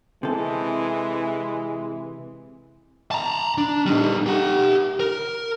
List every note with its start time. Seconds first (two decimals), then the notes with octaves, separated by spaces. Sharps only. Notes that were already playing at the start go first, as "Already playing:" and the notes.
0.23 C3 E3 G#3 A4
3.11 A5 A#5
3.58 D4
3.86 G3 D#4
4.26 G4 F#5
5.00 A#4